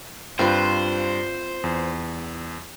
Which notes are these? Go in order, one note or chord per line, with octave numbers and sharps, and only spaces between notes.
G2 C4 F4 B4 C5
E2